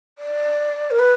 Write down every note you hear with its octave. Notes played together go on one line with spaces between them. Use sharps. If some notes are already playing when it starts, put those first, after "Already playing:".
D5
A#4
B4